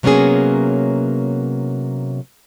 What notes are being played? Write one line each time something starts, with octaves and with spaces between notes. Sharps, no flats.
C3 F#3 A#3 B3 C#4 G#4